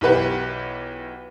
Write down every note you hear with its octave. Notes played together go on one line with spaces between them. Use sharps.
B1 E3 G4 B4 F#5